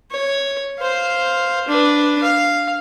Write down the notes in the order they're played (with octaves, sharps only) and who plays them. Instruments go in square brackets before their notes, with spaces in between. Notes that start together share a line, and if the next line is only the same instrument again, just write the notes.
[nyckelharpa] C#5
C5 F5
D4 B4
F5